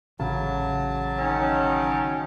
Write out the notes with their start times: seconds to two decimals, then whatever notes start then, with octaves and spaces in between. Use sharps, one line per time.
0.19 A1 C#3 F#3 A5
1.18 D#3 C#4